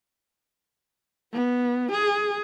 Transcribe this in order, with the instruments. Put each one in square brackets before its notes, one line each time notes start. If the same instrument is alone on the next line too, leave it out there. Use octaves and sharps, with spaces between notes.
[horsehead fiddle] B3
G#4